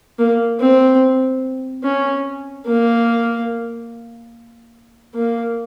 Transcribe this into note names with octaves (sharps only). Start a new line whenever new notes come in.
A#3
C4
C#4
A#3
A#3